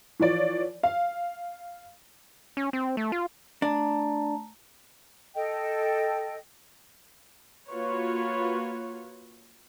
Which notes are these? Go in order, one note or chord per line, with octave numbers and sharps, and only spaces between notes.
E3 F3 C#5 D5
F5
C#4
C4
A3
F4
A3 D4 A5 A#5
A4 D#5 G5
A#3 F4 F#4 B4 C#5